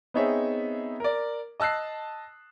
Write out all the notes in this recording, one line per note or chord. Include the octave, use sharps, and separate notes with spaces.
B3 C4 D#4 G#4 C#5 E5
A#4 D5
D#5 A5 E6 F#6 C7